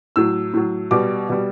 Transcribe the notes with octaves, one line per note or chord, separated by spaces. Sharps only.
A2 F#3 E6
A2 F#3
B2 G3 D6
B2 G3